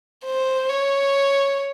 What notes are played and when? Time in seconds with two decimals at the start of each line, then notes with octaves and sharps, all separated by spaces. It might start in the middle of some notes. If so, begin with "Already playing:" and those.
0.25 C5
0.69 C#5